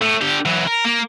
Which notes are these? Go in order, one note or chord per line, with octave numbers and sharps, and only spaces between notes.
A2
D3 G4
E3 F#3
A#4
A#3